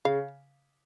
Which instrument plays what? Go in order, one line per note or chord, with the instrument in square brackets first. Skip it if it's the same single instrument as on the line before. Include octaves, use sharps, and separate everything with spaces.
[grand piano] C#3 [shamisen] F5